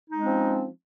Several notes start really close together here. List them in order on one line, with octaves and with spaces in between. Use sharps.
D#4 G#3 C#4 C4 F3